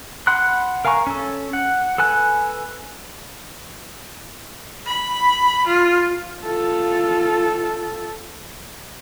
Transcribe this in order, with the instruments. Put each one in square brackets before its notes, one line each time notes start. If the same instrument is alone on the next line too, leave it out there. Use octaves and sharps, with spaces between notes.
[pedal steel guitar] F#5 B5 C6 F#6
A#4 F5 G#5 A#5 C#6
C#4 A4
F#5
A4 B4 G#5 F#6
[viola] B5
F4
[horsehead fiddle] F4 A4